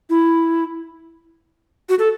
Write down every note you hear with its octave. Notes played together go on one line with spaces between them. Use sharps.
E4
F#4
A4